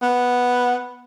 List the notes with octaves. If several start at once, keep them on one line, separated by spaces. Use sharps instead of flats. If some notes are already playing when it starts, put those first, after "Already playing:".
B3